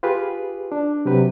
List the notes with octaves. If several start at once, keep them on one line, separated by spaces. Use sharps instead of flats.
F4 G4 G#4 B4
D4
C3 F#3 G4 B4